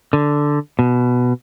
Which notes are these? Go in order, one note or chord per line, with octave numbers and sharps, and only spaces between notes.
D3
B2